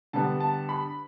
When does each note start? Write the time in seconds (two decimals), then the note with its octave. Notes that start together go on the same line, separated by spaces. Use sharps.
0.13 D3 G3 B3 A5
0.40 A5
0.69 B5